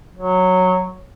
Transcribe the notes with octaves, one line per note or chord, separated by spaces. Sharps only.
F#3